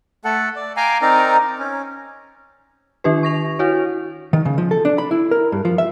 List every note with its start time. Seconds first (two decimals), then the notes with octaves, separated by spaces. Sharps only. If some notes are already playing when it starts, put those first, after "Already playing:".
0.25 A3 A4 F#5
0.56 D5
0.76 F5 G5 G#5 A#5 D6
1.02 C4 D#4 A#4 D5 A#5
1.59 C#4
3.04 D#3 D4 G4 B4
3.23 C#6 A#6 F7
3.59 E4 F#4 C#5
4.33 D#3
4.45 C#3
4.58 F3
4.71 A4
4.85 D4
4.98 B5
5.11 E4
5.31 A#4
5.52 G2
5.65 F3
5.78 E5